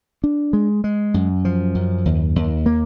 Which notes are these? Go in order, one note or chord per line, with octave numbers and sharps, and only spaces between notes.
D4
G#3
G#3
F#2
F3
F#2
D#2
D#2
A#3